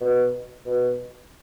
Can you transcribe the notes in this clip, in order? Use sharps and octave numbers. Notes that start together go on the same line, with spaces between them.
B2
B2